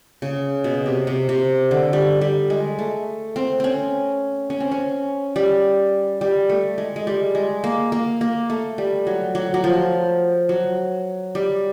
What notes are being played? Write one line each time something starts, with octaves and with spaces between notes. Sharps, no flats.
C#3
B2
C3
C3
C3
D3
G3
G3
G#3
A3
C4
C4 C#4
C#4
C4
C#4
G3
G3
A3
G#3
G#3
G3
G#3
A#3
A#3
A#3
A3
G3
F#3
F#3
F#3
F3
F#3
G3